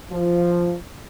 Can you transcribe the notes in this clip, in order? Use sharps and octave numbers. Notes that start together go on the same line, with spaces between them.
F3